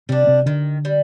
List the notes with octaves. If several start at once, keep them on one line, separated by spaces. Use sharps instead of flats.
C3 G3 C4 D4
C3 C4
D3 D#3 D4
G3